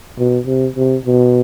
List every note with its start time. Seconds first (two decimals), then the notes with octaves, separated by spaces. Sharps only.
0.19 B2
0.47 C3
0.76 C3
1.06 B2